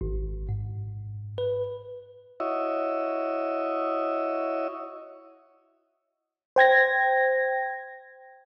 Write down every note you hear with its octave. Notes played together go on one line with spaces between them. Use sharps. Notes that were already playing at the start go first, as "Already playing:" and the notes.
G#1
G#2
B4
E4 F#4 C#5 D#5 E5
C5 G5 G#6 A#6